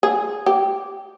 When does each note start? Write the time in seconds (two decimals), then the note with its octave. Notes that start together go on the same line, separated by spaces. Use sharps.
0.03 G#4
0.46 G4